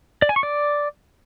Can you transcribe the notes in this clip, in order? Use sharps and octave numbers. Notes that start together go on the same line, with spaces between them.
D5
G#5
C#6
D5